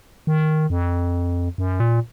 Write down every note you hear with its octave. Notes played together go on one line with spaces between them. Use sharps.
D#3
F2
F#2
A#2